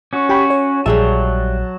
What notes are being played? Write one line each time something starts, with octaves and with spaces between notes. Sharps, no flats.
C#4 F#4
G4 G5 B5
C#5
A#1 F#3 G3 G#4 E5 A5